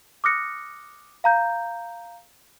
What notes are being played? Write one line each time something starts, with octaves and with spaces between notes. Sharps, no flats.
D6 D#6 F6 F#6 A#6 C#7
F5 A#5 G6